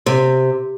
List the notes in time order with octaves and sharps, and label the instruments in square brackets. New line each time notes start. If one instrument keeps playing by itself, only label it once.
[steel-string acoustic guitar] C3